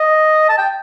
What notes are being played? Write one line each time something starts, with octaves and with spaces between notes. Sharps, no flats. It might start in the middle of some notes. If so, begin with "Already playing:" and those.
Already playing: D#5
A5
G5